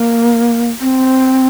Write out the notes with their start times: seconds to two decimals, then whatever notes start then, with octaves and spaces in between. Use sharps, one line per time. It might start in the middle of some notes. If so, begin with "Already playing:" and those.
Already playing: A#3
0.81 C4